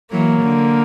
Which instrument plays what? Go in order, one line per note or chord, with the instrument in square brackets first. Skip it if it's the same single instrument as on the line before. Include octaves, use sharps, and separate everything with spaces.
[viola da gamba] E3 F#3 [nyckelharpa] A#3
[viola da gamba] D3